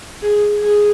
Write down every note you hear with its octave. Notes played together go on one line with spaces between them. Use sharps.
G#4
G#4